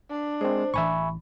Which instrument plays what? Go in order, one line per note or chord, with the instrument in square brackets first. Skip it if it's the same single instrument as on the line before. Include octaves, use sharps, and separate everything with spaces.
[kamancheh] D4
[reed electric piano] G#3 C4 [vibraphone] C5
[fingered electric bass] A1 E3 [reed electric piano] E5 G#5 C#6 [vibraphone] B5